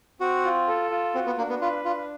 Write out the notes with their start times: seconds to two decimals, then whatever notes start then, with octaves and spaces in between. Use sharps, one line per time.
0.20 C4 F#4
0.45 F4
0.68 A4
0.91 F4
1.15 C4 F#4
1.26 B3
1.38 A#3 D4
1.50 B3
1.62 F4 B4
1.85 D4 F4